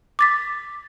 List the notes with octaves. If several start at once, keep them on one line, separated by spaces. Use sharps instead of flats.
D6 A6 B6